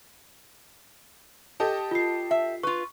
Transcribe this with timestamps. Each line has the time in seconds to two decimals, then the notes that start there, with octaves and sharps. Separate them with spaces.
1.60 G4 A4 D#5
1.91 F4 C7
2.31 E5
2.63 F4 B4 C#6